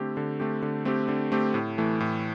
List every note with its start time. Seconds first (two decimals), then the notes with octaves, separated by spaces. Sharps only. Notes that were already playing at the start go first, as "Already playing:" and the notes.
Already playing: D3 A3 C4 G4
0.17 D3
0.40 A3 C4 G4
0.62 D3
0.85 A3 C4 G4
1.08 D3
1.32 A3 C4 G4
1.54 A2
1.78 E3 A3
2.00 A2